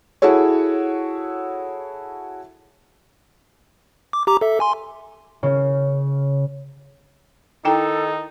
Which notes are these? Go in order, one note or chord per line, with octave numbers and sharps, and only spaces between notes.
E4 F#4 G#4 A4 C#5
D6
G4 A#5 D6
A4 E5
G#5 C6
C#3
D#3 D#4 E4 A4 G5 A#5